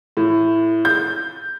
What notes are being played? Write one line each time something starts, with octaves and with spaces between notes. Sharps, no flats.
A2
G6